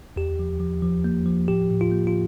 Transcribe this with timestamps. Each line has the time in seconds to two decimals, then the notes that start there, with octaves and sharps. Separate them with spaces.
0.16 E2 G4
0.39 F3
0.60 F3
0.82 F3
1.04 A#3
1.26 F3
1.48 A2 G4
1.71 A2
1.81 F4
1.91 A#3
2.07 F4